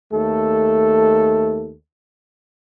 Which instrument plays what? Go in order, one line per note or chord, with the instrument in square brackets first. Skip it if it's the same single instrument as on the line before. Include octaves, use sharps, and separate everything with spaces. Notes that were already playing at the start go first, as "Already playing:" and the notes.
[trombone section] D#2 A3 A4